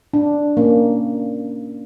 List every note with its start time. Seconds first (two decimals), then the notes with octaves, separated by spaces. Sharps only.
0.13 D4
0.57 A#3 C#4